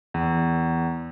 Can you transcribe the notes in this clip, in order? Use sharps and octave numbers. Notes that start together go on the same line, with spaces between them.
E2